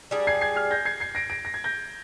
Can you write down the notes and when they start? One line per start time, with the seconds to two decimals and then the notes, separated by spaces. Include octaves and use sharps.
0.11 G3 D4 G#4
0.27 G#6 C7
0.41 G#6 C7
0.56 F6 G#6
0.71 G6 A#6
0.85 G#6 C7
1.00 G#6 C7
1.15 A#6 D7
1.30 A#6 D7
1.45 A#6
1.54 G#6
1.64 G6 A#6